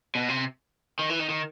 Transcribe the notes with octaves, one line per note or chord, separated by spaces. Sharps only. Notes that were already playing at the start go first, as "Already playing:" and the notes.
B2
C3
D#3
E3
D#3
D#3